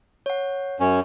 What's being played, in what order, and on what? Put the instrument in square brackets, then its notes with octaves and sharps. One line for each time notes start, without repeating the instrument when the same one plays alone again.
[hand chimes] C#5 F#5
[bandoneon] F#2 C#4